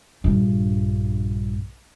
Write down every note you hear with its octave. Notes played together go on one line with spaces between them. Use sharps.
A#1 G2